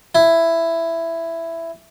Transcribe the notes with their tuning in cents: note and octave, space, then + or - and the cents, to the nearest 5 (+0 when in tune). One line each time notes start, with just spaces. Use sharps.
E4 +10